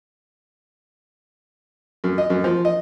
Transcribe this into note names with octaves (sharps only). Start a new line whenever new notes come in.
F#2
D#5
F#2
F3
D#5